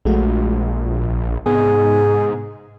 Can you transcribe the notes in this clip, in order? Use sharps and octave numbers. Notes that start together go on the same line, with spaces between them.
A#1 G#3 A3 F#4
G#1
G#2 C3 B3 G#4